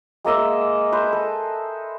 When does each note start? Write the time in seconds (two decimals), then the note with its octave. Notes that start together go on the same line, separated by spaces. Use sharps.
0.25 G#3 A#3 D#5 E5
0.92 B4 C5
1.13 A4